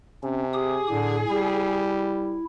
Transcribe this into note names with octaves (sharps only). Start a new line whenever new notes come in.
C3 C#4
G4 G#4 D#6
A2 D3
G3 E4